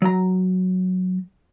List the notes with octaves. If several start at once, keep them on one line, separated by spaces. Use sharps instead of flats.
F#3 A#5